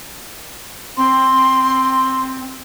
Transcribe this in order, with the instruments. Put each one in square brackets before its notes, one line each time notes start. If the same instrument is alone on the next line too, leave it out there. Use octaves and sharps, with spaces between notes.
[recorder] C4 [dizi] C6